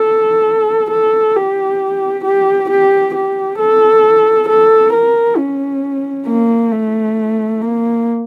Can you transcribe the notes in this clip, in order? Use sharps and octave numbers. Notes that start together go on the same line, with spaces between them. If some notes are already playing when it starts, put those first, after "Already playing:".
Already playing: A4
A4
G4
G4
G4
G4
A4
A4
A#4
C#4
A#3
A3
A#3